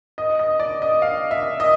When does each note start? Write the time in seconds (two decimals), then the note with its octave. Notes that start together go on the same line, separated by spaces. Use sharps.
0.18 D#5
0.39 D#5
0.60 D5
0.82 D#5
1.02 F5
1.31 E5
1.60 D#5